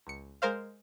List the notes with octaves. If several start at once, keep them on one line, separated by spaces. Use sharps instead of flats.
C#2 C#7
G#3 A#4 C5 F5